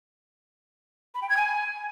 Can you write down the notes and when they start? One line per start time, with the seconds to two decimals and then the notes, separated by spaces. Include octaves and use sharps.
1.15 B5
1.22 G5
1.29 G#6
1.37 G#5